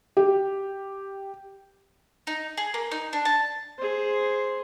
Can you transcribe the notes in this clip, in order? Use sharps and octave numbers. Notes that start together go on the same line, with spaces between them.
G4
D#4
G#4
A#3
D#4
D4
A5
G#4 C5